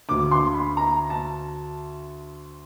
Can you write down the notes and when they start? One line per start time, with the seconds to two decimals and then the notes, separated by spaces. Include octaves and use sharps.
0.09 D2 D3 D6
0.31 C6
0.54 B5
0.77 A#5
1.10 A5